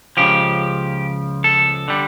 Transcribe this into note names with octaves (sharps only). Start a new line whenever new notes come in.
C#2 C#3 F3 G4
A4
D3 G3